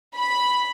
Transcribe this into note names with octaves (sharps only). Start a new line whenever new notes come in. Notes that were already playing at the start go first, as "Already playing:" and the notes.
B5